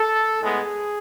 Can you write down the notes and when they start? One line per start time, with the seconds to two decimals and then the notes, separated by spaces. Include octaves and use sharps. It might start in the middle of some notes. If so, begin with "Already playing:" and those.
Already playing: A4
0.41 A2 G#3 B3 G#4